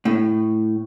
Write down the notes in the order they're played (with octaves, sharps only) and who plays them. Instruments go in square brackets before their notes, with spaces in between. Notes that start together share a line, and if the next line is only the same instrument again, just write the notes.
[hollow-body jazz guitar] A2